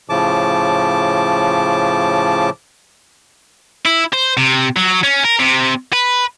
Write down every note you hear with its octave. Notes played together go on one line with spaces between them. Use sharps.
A2 C#3 F3 A5 D6
E4
C5
C3
F#3
C#4
A#4
C3
B4